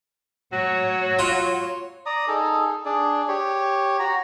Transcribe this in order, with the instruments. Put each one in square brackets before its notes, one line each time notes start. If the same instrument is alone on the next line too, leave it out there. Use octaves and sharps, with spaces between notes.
[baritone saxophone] F#3 [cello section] C#5
[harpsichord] F4
[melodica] D5 A#5 D#6
D#4 G#4 A4
D4 G#4 D5
G4 C#5
F#4 A#5